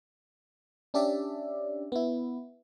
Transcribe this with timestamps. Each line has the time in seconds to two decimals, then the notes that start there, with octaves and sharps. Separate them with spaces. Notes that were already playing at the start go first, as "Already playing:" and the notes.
0.94 C#4 D4 G4 D5 E5
1.92 B3 E4